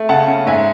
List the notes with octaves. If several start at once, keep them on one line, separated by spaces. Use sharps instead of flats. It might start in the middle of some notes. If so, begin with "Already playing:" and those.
Already playing: A3
C#3 F#5 A5
C#4
G#2 E5 G#5